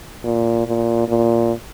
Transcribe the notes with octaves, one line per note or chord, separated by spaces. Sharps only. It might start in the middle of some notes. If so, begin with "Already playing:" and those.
A#2
A#2
A#2